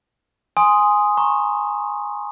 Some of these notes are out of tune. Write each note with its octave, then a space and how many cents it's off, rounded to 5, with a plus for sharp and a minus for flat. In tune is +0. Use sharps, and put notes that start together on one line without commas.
G#5 +0 C6 +0 D#6 +0
A#5 +0 C#6 -20